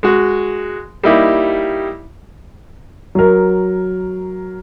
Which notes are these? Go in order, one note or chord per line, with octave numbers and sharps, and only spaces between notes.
G#3 F#4
G3 A#3 D#4 E4 G4
F#3 A#4